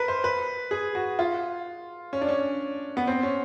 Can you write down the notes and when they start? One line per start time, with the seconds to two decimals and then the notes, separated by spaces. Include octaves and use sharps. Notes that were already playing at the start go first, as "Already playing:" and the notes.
Already playing: A#4 B4
0.08 C5
0.24 B4
0.71 G#4
0.95 F#4
1.19 F4
2.13 C#4
2.21 D4
2.29 C#4
2.97 B3
3.07 C4
3.23 C#4